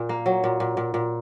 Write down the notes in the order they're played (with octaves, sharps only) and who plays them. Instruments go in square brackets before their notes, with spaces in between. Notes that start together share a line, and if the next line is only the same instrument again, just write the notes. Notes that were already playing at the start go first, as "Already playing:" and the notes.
Already playing: [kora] A#2
A#3
F#3
A#2
A#2
A#2
A#2